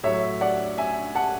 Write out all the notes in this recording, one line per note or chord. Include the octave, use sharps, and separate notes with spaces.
A2 F#3 C#5 E5
D5 F#5
E5 G#5
F#5 A5